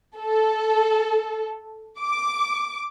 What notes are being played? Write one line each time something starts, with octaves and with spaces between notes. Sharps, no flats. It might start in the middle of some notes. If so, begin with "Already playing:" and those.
A4
D6